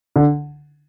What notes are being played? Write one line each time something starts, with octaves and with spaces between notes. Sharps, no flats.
D3